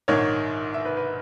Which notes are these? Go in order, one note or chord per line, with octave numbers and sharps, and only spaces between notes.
A#1 G#2 D#3 C#5
E5
B4
B4